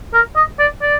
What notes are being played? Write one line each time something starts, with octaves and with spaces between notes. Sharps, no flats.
A#4
D#5
D5
D5